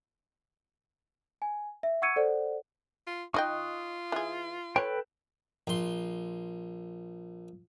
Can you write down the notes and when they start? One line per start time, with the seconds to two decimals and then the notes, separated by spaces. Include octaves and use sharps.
1.42 G#5
1.83 E5
2.02 F#5 C#6 E6 G#6 C#7 D#7
2.16 A4 C5 D5 F#5
3.07 F4
3.34 D#4 F4 D#5 G5 C#6 D#6 F#6
4.12 E3 G#4
4.76 A4 B4 C#5 G5
5.67 A#1 C6